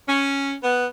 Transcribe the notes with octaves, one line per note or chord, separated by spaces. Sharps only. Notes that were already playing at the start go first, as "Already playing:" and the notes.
C#4
B3